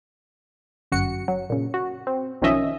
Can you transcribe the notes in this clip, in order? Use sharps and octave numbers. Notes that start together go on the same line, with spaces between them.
G1 F#2 F#4 C#7
F#3
A#2 C#3
F#4
C4
B1 D#3 F3 C#4 D#5 E5